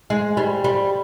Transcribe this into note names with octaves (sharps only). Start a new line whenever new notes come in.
G#3
G3
G3